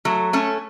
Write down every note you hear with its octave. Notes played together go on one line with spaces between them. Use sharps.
F#3 A3
A3 C#4